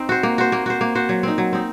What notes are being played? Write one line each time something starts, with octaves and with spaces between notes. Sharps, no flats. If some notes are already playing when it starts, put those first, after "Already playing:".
Already playing: C4 D#4
F#4 C5
A#3
F#4 C5
A#3
F#4 C5
A#3
F#4 C5
F#3
C4 D#4
F#3
C4 D#4